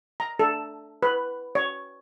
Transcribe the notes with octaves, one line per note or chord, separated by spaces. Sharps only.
A#5
A4
B4
C#5